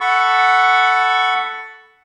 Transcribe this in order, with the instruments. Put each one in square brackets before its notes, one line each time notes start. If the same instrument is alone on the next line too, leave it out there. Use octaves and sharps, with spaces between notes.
[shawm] A4 [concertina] F#5 B5 C#6